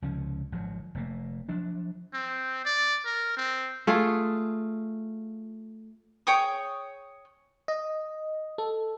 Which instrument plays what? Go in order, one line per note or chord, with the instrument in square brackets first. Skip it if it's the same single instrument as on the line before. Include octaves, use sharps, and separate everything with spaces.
[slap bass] C#2 C3 F3 C#4
G#1 F3 F#3
F1 A3 A#3
F3 F#3 D4
[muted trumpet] C4
D5
A#4
C4
[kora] A3 F4 G#4
[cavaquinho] G#4 C#5 G5 D#6
[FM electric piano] D#5
A4